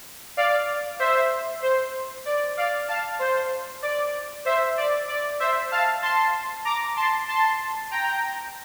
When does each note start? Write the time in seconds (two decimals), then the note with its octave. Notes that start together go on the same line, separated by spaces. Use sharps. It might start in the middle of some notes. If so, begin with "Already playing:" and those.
0.37 D5 F5
0.99 C5 E5
1.62 C5
2.25 D5
2.57 D5 F5
2.88 F5 A5
3.19 C5
3.82 D5
4.45 C5 E5
4.77 D5
5.08 D5
5.40 C5 E5
5.71 F5 A5
6.02 A5 C6
6.65 A#5 D6
6.97 A5 C6
7.28 A5 C6
7.91 G5 A#5